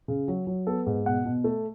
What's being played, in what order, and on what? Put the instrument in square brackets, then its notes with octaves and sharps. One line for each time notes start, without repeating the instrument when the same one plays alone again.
[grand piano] C#3
F#3
F#3
B3 A4
G#2
B2 F#5
B2
A3